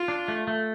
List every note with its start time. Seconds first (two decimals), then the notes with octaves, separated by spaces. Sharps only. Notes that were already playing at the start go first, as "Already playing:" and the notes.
Already playing: F4
0.08 D4
0.28 A3
0.48 A3